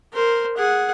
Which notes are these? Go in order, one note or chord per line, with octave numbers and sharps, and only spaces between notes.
A#4 C5
G#4 F#5